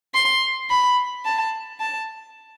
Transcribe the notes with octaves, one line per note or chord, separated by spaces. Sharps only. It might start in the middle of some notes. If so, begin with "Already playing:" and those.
C6
B5
A5
A5